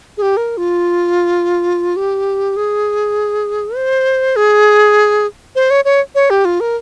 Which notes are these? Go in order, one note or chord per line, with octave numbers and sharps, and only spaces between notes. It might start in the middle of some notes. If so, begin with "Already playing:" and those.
G#4
G4
A#4
F4
G4
G#4
C5
G#4
C5
C#5
C#5
C#5
G4
F4
A#4